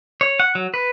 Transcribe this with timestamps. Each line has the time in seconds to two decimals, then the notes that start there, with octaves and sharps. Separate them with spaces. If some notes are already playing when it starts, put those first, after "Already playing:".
0.21 C#5
0.40 F#5
0.55 F#3
0.74 B4